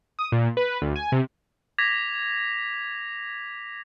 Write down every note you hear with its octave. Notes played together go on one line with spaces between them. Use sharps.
D#6
A#2
B4
D2
G#5
C3
D6 G#6 A#6 B6 F7